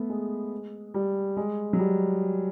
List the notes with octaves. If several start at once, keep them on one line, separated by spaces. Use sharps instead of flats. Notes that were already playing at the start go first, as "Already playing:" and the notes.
Already playing: A3 B3
G#3
G3
G#3
F#3
G3